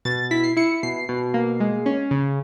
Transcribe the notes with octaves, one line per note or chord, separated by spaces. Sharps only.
B2 A6
E4 B6
C7
E4 C#7
B2 C7
B2
A#3
G#3
C#4
C#3